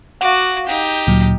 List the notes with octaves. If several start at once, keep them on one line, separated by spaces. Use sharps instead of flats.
F#4 F5 F#5 D6
D#4 G4
D2 A#2 F#3